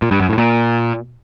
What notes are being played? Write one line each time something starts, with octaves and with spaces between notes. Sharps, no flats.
A#2
G2
F#2
A2
A#2